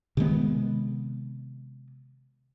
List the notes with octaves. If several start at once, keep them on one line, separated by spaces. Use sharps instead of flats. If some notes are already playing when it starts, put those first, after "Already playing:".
C3 D#3 G#3 B3